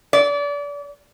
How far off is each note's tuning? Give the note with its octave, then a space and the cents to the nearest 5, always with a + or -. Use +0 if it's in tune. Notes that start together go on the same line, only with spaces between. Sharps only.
D5 -30